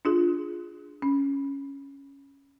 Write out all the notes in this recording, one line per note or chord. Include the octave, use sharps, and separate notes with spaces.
D4 F4 G#4
C#4